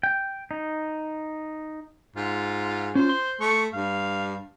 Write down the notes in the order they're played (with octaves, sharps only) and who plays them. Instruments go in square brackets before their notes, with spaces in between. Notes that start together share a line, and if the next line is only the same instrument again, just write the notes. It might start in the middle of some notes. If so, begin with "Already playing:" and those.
[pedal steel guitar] G5
D#4
[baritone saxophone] G#2 [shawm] F4
[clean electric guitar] C#4 D4 F4 [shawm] C5
[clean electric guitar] C6
[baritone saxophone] A3 [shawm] C#6
[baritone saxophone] G2 [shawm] F5